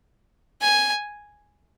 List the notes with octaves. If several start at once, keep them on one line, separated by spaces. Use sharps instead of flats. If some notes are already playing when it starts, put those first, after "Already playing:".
G#5